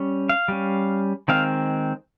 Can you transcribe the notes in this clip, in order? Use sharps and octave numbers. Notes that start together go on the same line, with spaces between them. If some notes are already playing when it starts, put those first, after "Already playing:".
Already playing: G3 C#4
F5
G3 C#4
D#3 G#3 C4 F5